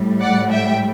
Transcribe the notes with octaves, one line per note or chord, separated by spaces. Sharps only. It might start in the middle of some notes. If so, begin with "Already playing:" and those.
Already playing: A2 G3
D5 F#5
E5 G5